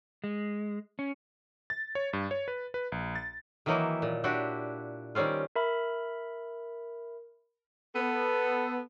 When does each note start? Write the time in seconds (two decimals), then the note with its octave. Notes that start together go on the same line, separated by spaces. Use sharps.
0.24 G#3
0.99 C#4
1.70 A6
1.95 C#5
2.13 G2
2.31 C#5
2.48 B4
2.74 B4
2.92 A#1
3.16 A6
3.66 D#3 E3 F#3 A#3 D#4 E4
4.02 A#2
4.24 D4 E4 F#4 G4
5.15 D#3 G3 C4 C#4 F4
5.56 A#4 E5 B5
7.96 B3 A4